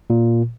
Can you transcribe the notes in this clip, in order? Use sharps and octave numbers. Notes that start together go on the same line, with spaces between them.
A#2